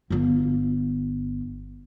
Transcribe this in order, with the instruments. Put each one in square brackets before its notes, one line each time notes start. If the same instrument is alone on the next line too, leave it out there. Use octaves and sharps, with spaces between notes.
[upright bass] G1 F4